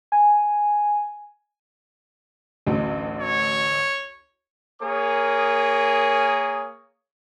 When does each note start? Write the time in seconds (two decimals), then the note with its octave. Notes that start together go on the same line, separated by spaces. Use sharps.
0.12 G#5
2.67 A1 D2 F#3
3.20 C#5
4.82 A#3 G#4 A#4 C#5 D#6